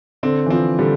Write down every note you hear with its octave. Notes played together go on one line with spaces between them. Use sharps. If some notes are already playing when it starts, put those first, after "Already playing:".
D3 C4
E3
F3 C4
D3 G3